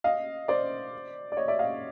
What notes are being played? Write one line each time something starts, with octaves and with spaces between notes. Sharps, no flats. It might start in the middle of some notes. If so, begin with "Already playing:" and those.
D#5 F5
C5 D5
D5
C#5 D#5
D5 E5
D#5 F5